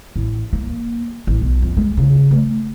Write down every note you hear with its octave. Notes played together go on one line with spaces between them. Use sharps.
A1
A#3
A1
B1
F2
G#3
C#3
A3